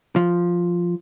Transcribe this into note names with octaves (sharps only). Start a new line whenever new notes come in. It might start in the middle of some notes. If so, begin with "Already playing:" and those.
F3